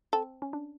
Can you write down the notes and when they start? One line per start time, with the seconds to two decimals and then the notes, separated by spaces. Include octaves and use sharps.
0.13 C4 A4
0.42 C#4
0.53 D4